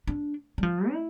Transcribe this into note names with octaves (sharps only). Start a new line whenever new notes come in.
D4
G3
F3
E4